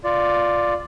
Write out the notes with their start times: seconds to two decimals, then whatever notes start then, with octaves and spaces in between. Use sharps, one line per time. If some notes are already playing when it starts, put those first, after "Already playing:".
0.04 F4 D5